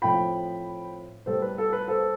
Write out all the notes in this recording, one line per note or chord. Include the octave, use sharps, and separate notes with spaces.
A2 F3 C4 G5 B5
A2 G3 B3 A4 C5
B4
A4
B4
A4 C5